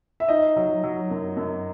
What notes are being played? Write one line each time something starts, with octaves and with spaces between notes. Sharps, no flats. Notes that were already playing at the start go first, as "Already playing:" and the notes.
E5
D#4 D#5
F#3
F#3
F#2
F#2